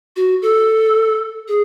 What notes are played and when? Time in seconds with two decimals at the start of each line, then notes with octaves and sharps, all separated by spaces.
0.16 F#4
0.42 A4
1.48 G#4